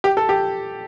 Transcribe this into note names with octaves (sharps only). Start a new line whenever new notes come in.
G4
A4
G4